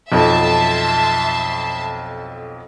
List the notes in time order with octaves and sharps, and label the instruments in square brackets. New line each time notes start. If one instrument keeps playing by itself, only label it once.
[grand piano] B1 F2 [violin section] E5 A5 C6